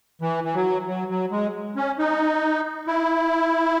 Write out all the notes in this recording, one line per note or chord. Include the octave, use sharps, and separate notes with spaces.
E3
E3
F#3
F#3
F#3
G#3
C#4
D#4
E4